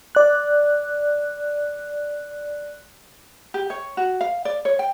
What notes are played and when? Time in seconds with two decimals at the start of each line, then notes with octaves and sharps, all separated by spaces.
0.15 D5 F#6
3.54 G4
3.70 C#5
3.97 F#4
4.21 F5
4.45 D5
4.65 C#5
4.79 G5